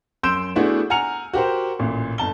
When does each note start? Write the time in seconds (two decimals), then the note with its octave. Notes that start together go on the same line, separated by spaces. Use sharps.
0.23 F#2 C6 E6 G6 D7 E7
0.55 A3 B3 D4 E4 F#4 G#4
0.90 F#5 G#5 A#5 F6 C#7 F7
1.33 F#4 G4 A#4 C5
1.79 A1 A#2
2.18 G1 A5 G7